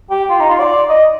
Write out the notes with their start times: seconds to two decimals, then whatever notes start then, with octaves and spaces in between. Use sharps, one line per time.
0.11 G4
0.30 F4
0.40 D#4
0.50 F4
0.60 D5
0.89 D#5